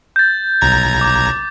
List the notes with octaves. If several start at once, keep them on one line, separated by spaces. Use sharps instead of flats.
G6 A6
B1 A#5 G#6
D6